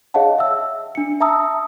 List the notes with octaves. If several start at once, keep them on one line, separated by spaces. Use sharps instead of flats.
G#4 C#5 D#5 F5 F#5 A5
E5 E6
D4 C#7
E5 A5 A#5 D#6 E6